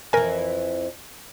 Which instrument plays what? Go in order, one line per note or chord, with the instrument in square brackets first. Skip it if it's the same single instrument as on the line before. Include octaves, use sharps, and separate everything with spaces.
[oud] F2 E3 [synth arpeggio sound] A#4 G#5